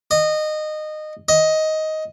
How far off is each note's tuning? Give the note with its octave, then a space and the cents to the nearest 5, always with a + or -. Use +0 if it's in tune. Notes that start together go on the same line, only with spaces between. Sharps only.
D#5 -20
D#5 +10